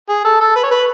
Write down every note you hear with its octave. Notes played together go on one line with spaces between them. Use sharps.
G#4
A4
A4
B4
C#5
B4